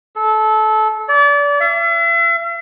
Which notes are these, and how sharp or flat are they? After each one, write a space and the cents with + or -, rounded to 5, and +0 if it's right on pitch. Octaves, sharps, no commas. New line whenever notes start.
A4 -20
D5 -30
E5 +40